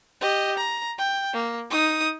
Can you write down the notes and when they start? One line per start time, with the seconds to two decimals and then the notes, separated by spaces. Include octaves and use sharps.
0.21 G4 D#5
0.57 A#5
0.98 G5
1.34 A#3
1.70 D#4 D#6